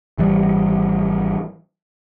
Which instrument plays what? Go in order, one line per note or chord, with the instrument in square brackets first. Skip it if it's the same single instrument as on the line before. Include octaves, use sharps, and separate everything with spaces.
[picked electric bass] G#1 E3 G3